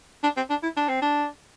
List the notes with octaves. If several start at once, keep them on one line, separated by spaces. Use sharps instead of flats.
D4
C4
D4
E4
D4
C4
D4